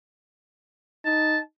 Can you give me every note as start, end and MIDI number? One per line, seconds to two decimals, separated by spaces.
1.05 1.40 63
1.05 1.39 81